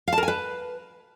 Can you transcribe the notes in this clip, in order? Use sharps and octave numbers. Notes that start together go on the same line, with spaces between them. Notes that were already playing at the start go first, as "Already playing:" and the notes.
F5
A5
A#4
G#5
B4